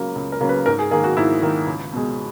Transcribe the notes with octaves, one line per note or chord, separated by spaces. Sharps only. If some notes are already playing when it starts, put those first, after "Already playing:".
Already playing: C#2 C#3 F#3 A#3
C#2
A#4
C#3 F#3 A#3
B4
G#2 A#4
G#4
D#3 A#3 G#4
F#4
G#2 E4
D#3 A#3
C#2
B2 G#3